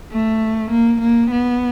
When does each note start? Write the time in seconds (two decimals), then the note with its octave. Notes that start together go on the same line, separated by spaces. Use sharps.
0.12 A3
0.71 A#3
1.01 A#3
1.31 B3